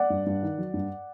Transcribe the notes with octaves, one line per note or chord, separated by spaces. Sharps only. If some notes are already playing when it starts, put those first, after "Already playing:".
Already playing: D5 F#5
G2
G2
D#3
F#3
G2